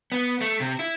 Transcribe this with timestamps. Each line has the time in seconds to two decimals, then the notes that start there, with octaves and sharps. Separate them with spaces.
0.12 B3
0.41 A3
0.60 C3
0.79 E4